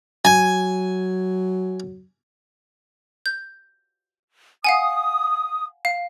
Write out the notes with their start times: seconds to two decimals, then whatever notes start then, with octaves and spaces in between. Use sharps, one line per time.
0.25 F#3 G#5
3.26 G6
4.64 F5 F#5 G#5 D#6
5.85 F5